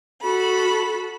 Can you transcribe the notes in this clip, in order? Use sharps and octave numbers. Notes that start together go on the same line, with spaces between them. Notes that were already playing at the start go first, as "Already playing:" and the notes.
F#4 A4 B5